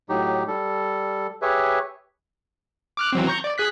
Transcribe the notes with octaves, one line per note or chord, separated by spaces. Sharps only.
A2 F#3 D#4 G4
G3 A4
G4 G#4 B4 C#5 E5
D6 F6 F#6
E3 F#3 C4
A#5 C#6 G6
D5
G#4 F#6 B6